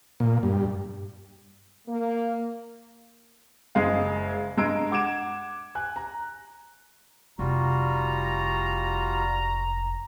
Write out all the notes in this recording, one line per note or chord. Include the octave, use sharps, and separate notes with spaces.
A#2
G2
A#3
F#1 G#3 G#4 F5
G2 G#3 A#5 E6 D7
F#5 D6 G#6 D7 E7
G#5 F#6
A#5
F1 G3 F4 F#4 A#5